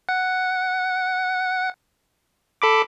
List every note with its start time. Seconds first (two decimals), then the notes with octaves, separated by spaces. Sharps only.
0.09 F#5
2.62 A4 B5 D6